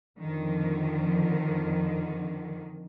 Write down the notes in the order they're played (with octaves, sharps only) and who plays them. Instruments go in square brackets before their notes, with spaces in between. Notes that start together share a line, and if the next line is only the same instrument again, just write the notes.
[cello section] F2 D3 D#3